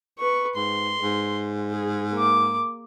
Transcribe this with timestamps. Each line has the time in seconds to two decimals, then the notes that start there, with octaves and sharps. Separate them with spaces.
0.19 B4 C#6
0.56 G#2 C6
1.01 G#2
1.72 G#4
2.13 A#3 D6